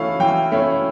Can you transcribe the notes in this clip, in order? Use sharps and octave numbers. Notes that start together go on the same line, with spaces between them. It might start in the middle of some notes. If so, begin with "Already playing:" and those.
Already playing: E3 A3 C#4 E4 F5 C#6
E3 G5
A3 C#4 E4